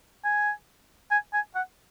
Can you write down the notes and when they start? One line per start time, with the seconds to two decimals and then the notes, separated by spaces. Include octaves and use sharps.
0.24 G#5
1.11 G#5
1.33 G#5
1.55 F#5